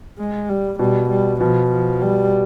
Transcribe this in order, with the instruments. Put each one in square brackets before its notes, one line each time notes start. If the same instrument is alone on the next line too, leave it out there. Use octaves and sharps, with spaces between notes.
[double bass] G#3
G3
[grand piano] B2 [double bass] G3
[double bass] G3
[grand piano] B2 [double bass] F3
[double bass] F3
G3